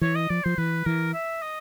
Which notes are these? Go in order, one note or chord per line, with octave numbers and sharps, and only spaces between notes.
E3 C#5
D#5
F3 D5
F3 C5
E3 B4
E3 A#4
E5
D#5